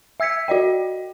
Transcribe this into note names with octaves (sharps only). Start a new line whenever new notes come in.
E5 E6 G#6 B6 C#7
F#4 D5 D#5 G5